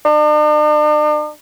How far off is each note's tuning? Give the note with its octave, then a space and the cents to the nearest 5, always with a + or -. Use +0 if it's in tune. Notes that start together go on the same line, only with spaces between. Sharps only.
D4 +45